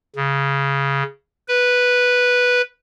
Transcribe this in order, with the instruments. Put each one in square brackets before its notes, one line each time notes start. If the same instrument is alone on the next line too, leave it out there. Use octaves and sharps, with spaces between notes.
[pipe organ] C#3
B4